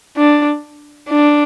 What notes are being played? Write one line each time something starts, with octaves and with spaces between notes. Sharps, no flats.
D4
D4